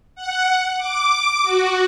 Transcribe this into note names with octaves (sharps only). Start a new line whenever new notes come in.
F#5
D6
F#4